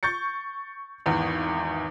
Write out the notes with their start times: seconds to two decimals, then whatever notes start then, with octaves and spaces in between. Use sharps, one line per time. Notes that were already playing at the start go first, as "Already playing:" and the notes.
0.03 C#6 G6 A6 C#7
1.06 G#1 E2